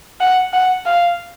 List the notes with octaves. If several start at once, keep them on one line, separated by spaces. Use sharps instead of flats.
F#5
F#5
F5